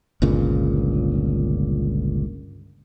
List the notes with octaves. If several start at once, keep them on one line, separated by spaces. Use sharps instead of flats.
G1 C#2 A#2 C#3